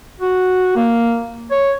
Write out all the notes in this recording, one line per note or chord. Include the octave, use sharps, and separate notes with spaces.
F#4
A#3
C#5